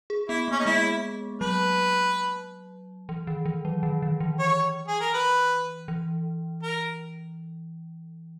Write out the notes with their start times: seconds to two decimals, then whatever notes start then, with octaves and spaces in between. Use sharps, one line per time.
0.10 G#4
0.29 B3 E4
0.48 A#3
0.52 C#4
0.59 D#4
0.66 G#3 E4
1.41 F#3 B4
3.09 E3
3.27 D#3
3.46 E3
3.65 F#3
3.83 D#3
4.02 D#3
4.20 E3
4.39 C#5
4.87 G#4
5.00 A#4
5.13 B4
5.88 E3
6.63 A#4